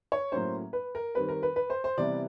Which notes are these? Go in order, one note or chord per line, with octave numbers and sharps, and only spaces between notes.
C#5
A2 F#3 A#3 C#4 C5
B4
A#4
D#3 G3 C4 B4
A#4
B4
B4
C5
C5
C3 E3 G3 B3 D5